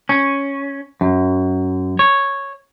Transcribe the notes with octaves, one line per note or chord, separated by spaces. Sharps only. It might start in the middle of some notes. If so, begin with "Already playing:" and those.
C#4
F#2
C#5